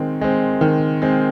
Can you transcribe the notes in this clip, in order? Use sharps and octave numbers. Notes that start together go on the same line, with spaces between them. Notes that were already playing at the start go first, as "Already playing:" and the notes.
Already playing: D#3 G#3 C4
G#3 C4
D#3
G#3 C4